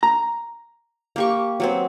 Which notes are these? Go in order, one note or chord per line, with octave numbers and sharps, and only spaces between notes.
A#5
A#3 G4 C#6
F#3 B3 C4